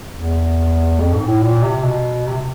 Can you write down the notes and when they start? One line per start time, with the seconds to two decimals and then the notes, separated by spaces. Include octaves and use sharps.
0.14 E2
0.99 F2
1.14 G#2
1.28 A2
1.42 A#2
1.63 C3
1.84 B2
2.28 C3